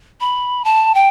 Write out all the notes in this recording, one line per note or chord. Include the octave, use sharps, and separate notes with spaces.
B5
A5
G5